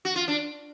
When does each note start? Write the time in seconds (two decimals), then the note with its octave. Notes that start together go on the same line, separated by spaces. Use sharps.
0.05 F#4
0.16 F4
0.28 D4